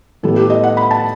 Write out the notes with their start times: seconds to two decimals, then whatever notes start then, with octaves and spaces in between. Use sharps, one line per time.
0.23 A2 G3 B3 A4
0.36 G4
0.50 D#5
0.63 F#5
0.77 B5
0.91 A5